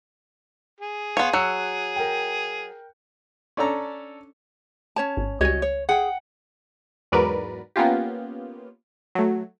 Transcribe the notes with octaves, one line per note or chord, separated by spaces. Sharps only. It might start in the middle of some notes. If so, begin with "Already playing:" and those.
G#4
B3 C#5 F5 C6
F#3 E6 F#6 C#7
A#4 G5
C#4 D4 A4 A#5
C#4 C#5 A5
G#1
C#2 G3 F#4 C#5 D#5 G#5
C#5
G#4 F#5 G5
E2 G#2 F#3 A#4 B4 D5
A#3 B3 C#4 F4 G4
F#3 A3